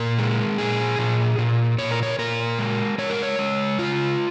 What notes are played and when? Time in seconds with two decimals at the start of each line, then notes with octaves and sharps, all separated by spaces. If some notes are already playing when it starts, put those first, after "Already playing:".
Already playing: A#2 A#4
0.18 G#3
0.58 A#2 G#4
0.99 A#2
1.38 A#2
1.78 A#2 C#5
1.91 A#4
2.03 C#5
2.19 A#2 A#4
2.59 G#3
2.98 G#3 C#5
3.10 A#4
3.22 C#5
3.39 G#3
3.79 C#3 F4